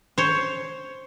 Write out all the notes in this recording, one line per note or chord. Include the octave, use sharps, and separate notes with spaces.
C5 C#5